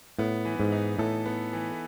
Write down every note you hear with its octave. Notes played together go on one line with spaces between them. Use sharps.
A2 B3
E3
G#2
D#4
A2 A4
B3
E3